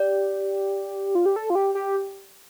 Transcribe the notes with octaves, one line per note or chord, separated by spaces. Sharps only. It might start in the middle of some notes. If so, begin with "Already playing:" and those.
Already playing: G4 D5
F4
G4
A4
F4
G4
G4